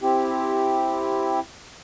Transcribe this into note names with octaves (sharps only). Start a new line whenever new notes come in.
C4 E4 G4